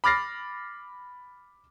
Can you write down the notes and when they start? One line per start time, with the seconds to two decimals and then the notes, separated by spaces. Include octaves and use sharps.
0.04 B5 D6 F6 A6 A#6 C7